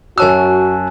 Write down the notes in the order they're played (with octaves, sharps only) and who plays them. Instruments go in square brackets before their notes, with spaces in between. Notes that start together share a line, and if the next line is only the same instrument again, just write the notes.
[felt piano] F#2 C#5 E6 [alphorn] F#4 [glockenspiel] G#5 A5 F#6